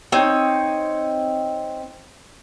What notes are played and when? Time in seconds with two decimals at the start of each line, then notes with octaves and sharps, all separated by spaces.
0.12 C4 D#4 C#5